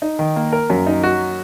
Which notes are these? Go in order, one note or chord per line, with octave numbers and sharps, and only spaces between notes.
D#4
D#3
A#3
A#4
F#2
D#4
F#4